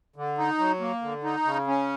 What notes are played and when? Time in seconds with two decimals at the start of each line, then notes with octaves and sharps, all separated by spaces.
0.16 D3
0.38 D#4
0.58 F#3
0.80 A#3
1.02 D3
1.24 D#4
1.45 C#3
1.67 C#4